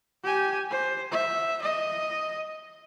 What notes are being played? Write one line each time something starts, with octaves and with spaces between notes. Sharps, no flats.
G4 G#5
C5
E5
D#5